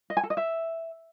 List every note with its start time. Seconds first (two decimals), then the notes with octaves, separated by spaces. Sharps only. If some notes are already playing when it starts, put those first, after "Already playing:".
0.10 D#5
0.17 G#5
0.23 A4
0.30 D#5
0.37 E5